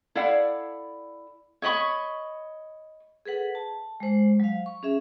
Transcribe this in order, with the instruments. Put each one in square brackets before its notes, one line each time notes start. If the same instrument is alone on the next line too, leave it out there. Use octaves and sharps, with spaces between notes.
[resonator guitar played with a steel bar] E4 A4 D5 F5 F#5
[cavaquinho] C#5 D#5 B5 C#6
[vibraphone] G#4 A4 B4 F#5
A5
G#3 C5
F#3 F5
C#6
C#4 G#4 E5